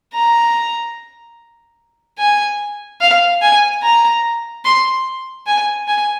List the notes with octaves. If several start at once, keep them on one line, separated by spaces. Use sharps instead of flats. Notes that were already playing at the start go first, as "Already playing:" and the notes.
A#5
G#5
F5
G#5
A#5
C6
G#5
G#5